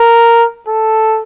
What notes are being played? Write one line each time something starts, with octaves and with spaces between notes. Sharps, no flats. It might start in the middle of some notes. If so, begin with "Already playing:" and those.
Already playing: A#4
A4